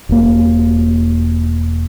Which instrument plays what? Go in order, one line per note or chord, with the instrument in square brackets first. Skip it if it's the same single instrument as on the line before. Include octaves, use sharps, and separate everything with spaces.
[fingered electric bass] E1 A#3